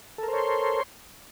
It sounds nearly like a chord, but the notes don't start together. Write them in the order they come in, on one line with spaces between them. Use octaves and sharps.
A4 A#4 C5 C#5 C6